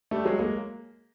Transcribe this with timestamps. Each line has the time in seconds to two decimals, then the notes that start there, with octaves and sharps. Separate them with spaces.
0.11 G3 A3
0.25 F#3 G#3
0.39 G#3 A#3